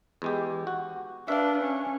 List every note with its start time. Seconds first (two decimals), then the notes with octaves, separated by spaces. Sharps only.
0.22 E2 G#3 G4
0.67 F#4
1.28 D4 B4 E5 F5
1.62 C#4